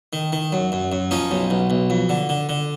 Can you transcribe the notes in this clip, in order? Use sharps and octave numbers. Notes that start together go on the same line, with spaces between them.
D#3
D#3
F#2
F#2
F#2
F3 C#4 D#4
B1
B1
B1
F2
D3
D3
D3